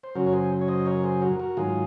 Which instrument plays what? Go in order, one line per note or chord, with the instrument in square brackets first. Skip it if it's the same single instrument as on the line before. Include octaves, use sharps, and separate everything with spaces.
[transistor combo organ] C5
F#2 C#3 F#3 F#4 A#4
C#5
G#4 C5
C#5
C5 D#5
A#4 C#5
G#4 C5
F#4 A#4
F#4 A#4
G#2 D#3 F#3 F4 G#4